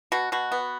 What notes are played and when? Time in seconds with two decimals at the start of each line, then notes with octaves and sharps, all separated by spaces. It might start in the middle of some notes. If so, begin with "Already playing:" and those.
0.12 B2 F#4
0.32 B2 F#4
0.52 B3